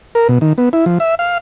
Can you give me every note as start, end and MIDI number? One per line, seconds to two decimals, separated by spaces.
0.15 0.28 70
0.29 0.39 47
0.41 0.53 51
0.58 0.69 59
0.73 0.85 64
0.86 0.98 53
1.00 1.15 76
1.19 1.38 77